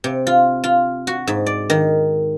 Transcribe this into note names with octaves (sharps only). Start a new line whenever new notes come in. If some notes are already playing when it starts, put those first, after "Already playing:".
C3
F4
F4
F#4
G#2
D5
D#3